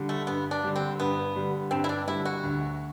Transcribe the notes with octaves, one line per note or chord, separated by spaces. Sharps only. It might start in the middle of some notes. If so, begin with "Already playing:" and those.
Already playing: D3 G3
A3
G2 B3
D4
D3 G3
C4
G2 B3
D3 G3
G2 C4
E4
D4
D3 G3 E4
F#4
D2